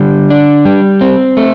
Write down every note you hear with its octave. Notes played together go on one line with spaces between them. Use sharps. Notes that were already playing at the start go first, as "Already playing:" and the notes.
Already playing: D3 G3
D4
G3
C4
A3